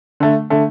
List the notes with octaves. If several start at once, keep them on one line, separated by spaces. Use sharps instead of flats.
D3 A3
D3 A3